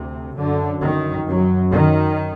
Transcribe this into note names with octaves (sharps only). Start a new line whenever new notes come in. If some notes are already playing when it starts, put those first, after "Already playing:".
Already playing: D2 C3
F#2 D3
D#3
F#2 F#3
D#3